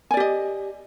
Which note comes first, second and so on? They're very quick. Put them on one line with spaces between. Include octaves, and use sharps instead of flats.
G#5 D5 G4 D#5